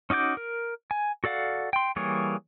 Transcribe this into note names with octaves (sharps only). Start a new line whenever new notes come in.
C#4 D#4 F#4 D6 G6
A#4
G#5
F#4 A4 D5 F5 F#5
G5 C6
E3 G3 A#3 G#4 C#5